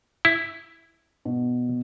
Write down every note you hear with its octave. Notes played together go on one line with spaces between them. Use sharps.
E4
B2